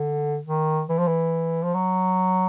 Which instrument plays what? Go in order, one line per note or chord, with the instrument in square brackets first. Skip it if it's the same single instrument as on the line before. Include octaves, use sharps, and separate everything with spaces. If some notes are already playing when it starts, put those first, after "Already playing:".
Already playing: [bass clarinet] D3
D#3
E3
F3
E3
F3
F#3